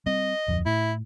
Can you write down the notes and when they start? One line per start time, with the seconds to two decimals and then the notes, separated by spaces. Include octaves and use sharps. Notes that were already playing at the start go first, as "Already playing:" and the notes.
0.06 G3 C4 D#5
0.48 D1 F2
0.66 A2 E4